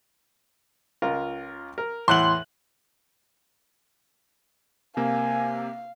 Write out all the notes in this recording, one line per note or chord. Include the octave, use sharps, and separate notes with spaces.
C#2 F4 A#4
A#4
E2 A2 F#5 C6 F#6 F#7
C3 A#3 F5 G#5